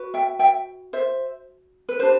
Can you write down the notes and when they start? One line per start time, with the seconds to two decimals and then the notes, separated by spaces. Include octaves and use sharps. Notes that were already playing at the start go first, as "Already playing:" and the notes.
Already playing: F#4 B4
0.14 E5 G5
0.39 E5 G5
0.93 C5 E5
1.89 B4
1.99 D4 G4 B4 C5